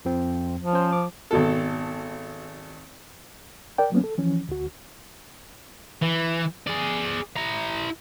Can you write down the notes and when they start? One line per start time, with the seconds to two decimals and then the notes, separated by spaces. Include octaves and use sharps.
0.05 F2 F3 C4
0.59 F3
0.73 C#4 C5
0.93 D6
1.31 G#1 B2 A4
3.78 A#4 D5 G5
3.92 F#3 A#3 B3 C#4
4.04 A4
4.18 E3 F3 C#4
4.49 D2 F#4
6.02 E3
6.67 G#4 D5
7.37 E4 A#5